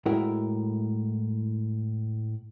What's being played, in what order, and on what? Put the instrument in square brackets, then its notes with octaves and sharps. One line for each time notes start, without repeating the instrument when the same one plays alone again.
[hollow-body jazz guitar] A2 G#3 E4 F#4 A#4 G5